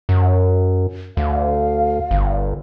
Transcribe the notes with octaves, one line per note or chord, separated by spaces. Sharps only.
F#2
D2 F5
G1